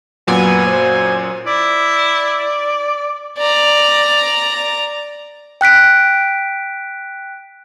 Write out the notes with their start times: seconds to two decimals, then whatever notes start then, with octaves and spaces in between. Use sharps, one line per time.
0.27 F#2 A#2 F#3 B3 G#5
0.67 C5
1.47 E4 D5
3.38 D5 A#5
5.61 G5 F#6 B6 D7